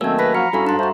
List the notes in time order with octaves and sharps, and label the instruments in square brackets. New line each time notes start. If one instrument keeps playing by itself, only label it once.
[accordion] D#3 A3 [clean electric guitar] F#3 A#3 C#4 [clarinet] C4 [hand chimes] E6 G#6
[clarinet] B4 [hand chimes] B5 A#6 B6
[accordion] F3 F#4 F6 [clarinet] A#5 [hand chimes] C#7
[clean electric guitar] G2 [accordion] C#4 E4 [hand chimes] F#4 A4 F5
[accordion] G#2 [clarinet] D4 [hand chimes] A#5 C6
[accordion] F#4 A5 [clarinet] C5 [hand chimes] E5 A#5